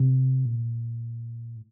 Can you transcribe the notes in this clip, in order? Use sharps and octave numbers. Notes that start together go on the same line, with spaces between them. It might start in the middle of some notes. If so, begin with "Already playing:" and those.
Already playing: C3
A#2
A2